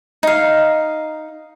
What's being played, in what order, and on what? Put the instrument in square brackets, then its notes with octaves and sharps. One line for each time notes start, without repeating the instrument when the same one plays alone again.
[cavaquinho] D#4 F5